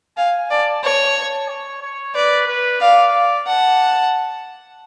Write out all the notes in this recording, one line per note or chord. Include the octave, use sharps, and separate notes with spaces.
F5 G#5
D5 A5
C#5 A5
A5
C#5
C#5
B4 D5
B4
D5 F5
F#5 A5